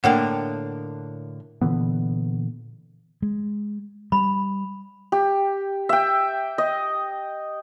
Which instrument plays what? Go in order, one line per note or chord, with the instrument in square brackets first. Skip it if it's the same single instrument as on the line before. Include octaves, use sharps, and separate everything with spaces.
[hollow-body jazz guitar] A2 D3 A#3 [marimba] F#5 G5
[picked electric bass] A#2 D3 E3 B3
[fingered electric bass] G#3
[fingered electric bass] G3 [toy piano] B5
[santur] G4
E5 G5
D#5